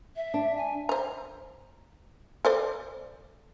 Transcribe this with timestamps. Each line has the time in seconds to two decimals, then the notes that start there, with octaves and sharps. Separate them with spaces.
0.16 E5
0.34 D4
0.57 G#5
0.89 C5 A#5
2.45 A4 C5 D5